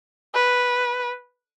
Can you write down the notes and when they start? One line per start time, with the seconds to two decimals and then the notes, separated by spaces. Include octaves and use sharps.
0.34 B4